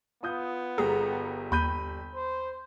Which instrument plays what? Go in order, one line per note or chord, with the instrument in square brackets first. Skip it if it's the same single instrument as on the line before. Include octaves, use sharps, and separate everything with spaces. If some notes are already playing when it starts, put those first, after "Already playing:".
[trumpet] B3 [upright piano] F4 D#6 G6
[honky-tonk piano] G1 G3 A#5 [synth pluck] G#4
[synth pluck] D#2 [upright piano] B5 G6 D#7
[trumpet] C5